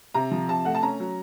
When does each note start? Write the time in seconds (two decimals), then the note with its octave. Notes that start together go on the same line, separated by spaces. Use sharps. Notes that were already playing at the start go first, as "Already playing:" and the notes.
0.14 C3 A#5
0.31 F3
0.48 C3 A5
0.65 A3 F#5
0.75 A5
0.83 C#4 A#5
1.00 F#3